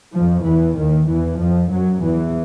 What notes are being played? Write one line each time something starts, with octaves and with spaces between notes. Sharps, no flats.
F2 F3
E2 E3
D#2 D#3
E2 E3
F2 F3
F#2 F#3
E2 E3